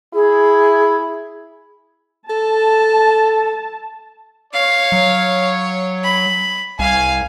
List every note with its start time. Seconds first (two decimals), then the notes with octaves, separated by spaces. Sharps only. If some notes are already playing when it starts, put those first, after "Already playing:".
0.14 E4 G#4
2.30 A4 A5
4.53 C#5 F5
4.92 F#3
6.03 B5
6.79 C2 F5 G#5